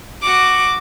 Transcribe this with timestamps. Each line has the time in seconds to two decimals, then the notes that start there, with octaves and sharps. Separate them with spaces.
0.23 F#4 D6